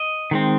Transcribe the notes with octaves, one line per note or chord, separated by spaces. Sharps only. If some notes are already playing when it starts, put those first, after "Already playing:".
Already playing: D#5
D#3 G#3 C4